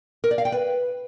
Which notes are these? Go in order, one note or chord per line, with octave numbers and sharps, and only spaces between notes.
A#4
D5
F5
G5
B4